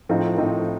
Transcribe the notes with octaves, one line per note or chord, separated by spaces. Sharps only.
A2 F3 C4 D#4
A2 F3 C4 D#4